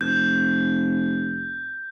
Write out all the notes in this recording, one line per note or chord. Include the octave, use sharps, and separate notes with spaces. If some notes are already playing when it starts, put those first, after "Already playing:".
F1 G6